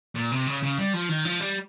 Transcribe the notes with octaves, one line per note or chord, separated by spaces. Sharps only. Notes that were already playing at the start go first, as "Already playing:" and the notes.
A#2
C3
C#3
C#3
G3
F3
D#3
F3
G3